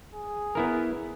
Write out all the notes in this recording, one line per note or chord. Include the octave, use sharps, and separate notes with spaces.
G#4
B3 E4 A#4